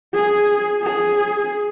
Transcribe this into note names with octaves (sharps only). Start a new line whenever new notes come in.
G#4
G#4